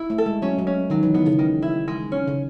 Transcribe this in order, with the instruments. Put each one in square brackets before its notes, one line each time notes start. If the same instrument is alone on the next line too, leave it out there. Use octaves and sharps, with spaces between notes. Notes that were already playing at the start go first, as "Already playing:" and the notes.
Already playing: [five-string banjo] E4
[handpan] A3
[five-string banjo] A4
[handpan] G#3
[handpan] F#3 [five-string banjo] C#4
[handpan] F#3
[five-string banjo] C#4
[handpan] D#3 [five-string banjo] F#3
[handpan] E3
[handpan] D#3 [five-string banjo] B3
[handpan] C#3
[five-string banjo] D#3
E4
G#3
C#4
[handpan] C#3